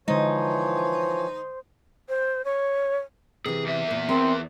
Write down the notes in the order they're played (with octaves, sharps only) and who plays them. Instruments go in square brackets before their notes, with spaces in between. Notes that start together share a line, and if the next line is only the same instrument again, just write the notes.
[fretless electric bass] D3 G#3 [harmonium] E3 F3 C#5 [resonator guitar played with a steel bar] D#4 [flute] C5
[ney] C5
C#5
[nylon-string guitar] C3 E3 [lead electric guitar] G#4
[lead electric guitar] E2 E5
[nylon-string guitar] A#2
[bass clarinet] C4 [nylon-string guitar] A#4